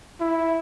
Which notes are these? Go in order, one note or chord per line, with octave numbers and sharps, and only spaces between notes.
E4